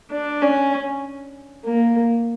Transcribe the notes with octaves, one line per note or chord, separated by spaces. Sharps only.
D4
C#4
A#3